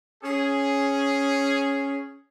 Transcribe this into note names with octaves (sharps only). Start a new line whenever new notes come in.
C#4 G#4